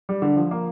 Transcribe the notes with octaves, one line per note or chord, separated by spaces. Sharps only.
G3
D3
F3
A#3